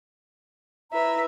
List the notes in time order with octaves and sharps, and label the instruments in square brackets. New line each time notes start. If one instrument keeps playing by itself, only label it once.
[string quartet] E4 B4 E5 [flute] A#5